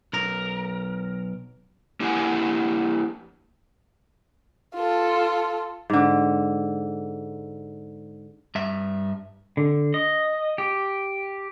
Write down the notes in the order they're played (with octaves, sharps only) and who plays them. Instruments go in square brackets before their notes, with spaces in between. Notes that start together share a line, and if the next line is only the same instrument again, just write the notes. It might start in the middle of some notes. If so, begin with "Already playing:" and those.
[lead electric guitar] B1 A#4
[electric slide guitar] A#3 E4 G4 F5 F#5 G#5
[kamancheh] F4 A4
[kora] G#2 D3
[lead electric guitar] G2 E5
[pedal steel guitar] D3
D#5
G4